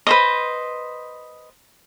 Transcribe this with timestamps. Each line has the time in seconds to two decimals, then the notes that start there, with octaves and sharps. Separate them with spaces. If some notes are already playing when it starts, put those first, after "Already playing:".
0.07 B4 C5 D#5